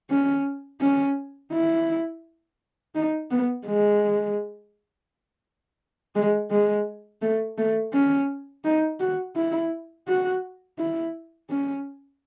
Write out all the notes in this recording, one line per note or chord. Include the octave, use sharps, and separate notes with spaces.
C#4
C#4
E4
D#4
B3
G#3
G#3
G#3
A3
A3
C#4
D#4
F#4
E4
F#4
E4
C#4